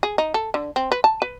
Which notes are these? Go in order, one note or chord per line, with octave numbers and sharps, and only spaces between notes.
G#4
D#4
A4
D3
C4
B4
A5
B4